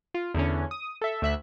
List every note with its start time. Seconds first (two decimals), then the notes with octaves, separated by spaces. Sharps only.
0.14 F4
0.34 E2 D3 C#4
0.71 D#6
1.02 A4 E5
1.22 D2 E5 F#6